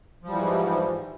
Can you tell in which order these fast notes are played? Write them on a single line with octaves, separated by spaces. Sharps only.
F3 G3 E3 G#2